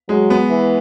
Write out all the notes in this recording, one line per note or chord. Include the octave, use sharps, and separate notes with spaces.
F#3 G#3
B3
E3